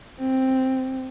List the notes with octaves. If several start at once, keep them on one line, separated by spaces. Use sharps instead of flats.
C4